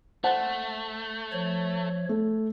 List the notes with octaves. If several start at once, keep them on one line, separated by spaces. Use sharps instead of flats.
A3 C5 F#5 A5
F3 C#5
A3